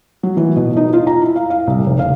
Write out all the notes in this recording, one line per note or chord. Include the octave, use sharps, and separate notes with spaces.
F#3
E3
B2
D#4
F4
A#5
E4
F5
F5
C2
F1
F5